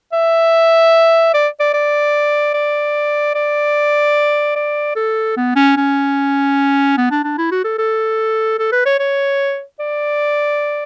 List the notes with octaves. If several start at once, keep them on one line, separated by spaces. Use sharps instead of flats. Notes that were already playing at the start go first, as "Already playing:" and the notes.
E5
D5
D5
D5
D5
D5
D5
A4
B3
C#4
C#4
B3
D4
D4
E4
F#4
A4
A4
A4
B4
C#5
C#5
D5